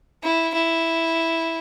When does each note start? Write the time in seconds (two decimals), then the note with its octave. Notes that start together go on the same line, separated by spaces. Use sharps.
0.23 E4
0.54 E4